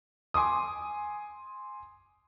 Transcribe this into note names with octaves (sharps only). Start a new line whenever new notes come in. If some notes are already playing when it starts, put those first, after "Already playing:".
G#5 C6 D6 D#6